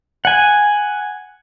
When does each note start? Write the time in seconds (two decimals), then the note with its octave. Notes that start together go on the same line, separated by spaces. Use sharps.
0.25 F#5 G#5